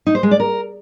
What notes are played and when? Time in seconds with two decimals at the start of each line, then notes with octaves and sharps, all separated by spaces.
0.07 D#4
0.15 C5
0.23 G#3
0.31 D5
0.40 A#4